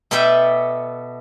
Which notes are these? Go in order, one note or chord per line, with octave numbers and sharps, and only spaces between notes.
B2 B3 A4 D5 E5 G5